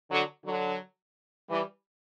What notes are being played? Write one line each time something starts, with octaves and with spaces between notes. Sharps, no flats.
D3 F#3
D3 F#3
E3 G3